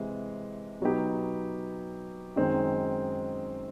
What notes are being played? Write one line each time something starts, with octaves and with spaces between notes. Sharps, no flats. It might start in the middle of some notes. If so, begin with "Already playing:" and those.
Already playing: C3 E3 G#3
B2 F#3 B3 D#4 G4
F#2 D#3 G#3 C4 D#4